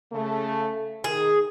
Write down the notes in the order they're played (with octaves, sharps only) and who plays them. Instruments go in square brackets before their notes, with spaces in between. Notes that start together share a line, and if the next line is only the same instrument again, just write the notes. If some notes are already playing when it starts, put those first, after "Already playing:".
[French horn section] C#3 A3
[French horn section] D#3 [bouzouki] G#4